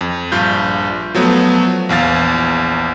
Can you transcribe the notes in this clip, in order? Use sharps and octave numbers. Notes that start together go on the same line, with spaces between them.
F2
A#1 G2 F4 G6
F3 F#3 A3 B3
A#1 E2 F5 A6